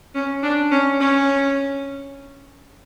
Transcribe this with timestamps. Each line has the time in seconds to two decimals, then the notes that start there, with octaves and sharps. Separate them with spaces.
0.14 C#4
0.43 D4
0.71 C#4
1.00 C#4